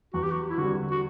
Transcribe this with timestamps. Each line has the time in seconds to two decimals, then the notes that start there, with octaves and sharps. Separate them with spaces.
0.14 E2 F#4
0.23 G4
0.31 F#4
0.50 E4
0.58 D3 G3 F#4
0.91 F#4